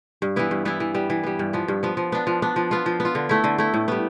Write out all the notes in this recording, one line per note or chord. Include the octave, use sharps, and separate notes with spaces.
G2
E3 B3 E4
G2
E3 B3 E4
E3
G3 B3
E3
G3 B3
G2
F3 B3
G2
F3 B3
F3
B3 D4
F3
B3 D4
F3
B3 F4
F3
B3
F4
D3
A3 E4
D3
A3 E4
A2
G3 B3